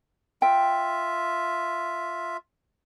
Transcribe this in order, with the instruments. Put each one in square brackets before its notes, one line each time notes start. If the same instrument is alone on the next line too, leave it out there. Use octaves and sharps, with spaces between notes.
[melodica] F4 E5 [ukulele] G5